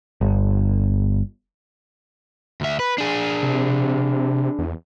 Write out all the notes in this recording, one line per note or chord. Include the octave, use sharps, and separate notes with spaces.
G1
D2 E5
B4
D4 G#4
C3
E2